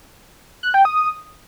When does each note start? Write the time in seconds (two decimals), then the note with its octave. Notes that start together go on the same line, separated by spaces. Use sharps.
0.63 F#6
0.74 G5
0.85 D#6